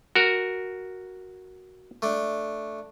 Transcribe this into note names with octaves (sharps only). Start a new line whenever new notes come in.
F#4 A#4
A3 D4